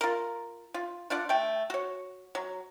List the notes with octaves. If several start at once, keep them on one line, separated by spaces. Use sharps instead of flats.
F4 A#4
F4
D4 F4 D5 F#5
A3 G5
F#4 C#5
F#3